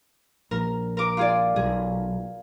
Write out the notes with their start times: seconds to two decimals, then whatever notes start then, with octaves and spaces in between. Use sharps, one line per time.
0.51 A#1 A#4
0.97 A#4 D6
1.17 F4 G#4 D5
1.56 B1 G#4